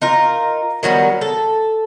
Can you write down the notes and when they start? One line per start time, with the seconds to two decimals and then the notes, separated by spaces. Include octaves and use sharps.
0.02 D#4 F4 A#4
0.83 D#3 F#3 G3 B3
1.21 A4